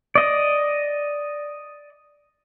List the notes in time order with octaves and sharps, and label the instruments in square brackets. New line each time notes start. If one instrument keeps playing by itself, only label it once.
[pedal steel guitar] D5 D#5